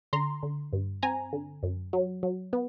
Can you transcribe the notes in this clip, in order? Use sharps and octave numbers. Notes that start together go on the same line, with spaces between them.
D3 A#5 C6
D3
G2
C4 G#5 A#5
D3
F#2
F#3
F#3
B3